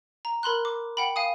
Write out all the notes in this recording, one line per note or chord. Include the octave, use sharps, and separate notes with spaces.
A#5
A#4 B5 C6 F#6
D6
F#5 G5 B5
F5 G#5 D#6